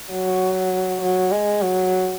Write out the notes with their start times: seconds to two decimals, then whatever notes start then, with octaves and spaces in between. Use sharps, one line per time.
0.11 F#3
1.01 F#3
1.31 G#3
1.62 F#3